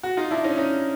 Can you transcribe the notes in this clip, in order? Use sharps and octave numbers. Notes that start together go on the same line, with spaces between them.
F#4
D#4 F4
D4 E4
C#4 D#4
C#4 D#4